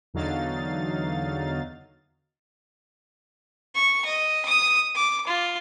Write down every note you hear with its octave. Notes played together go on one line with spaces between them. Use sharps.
E2 D3 F#3 D#4 F5 A6
C#6
D#5
D#6
D6
F4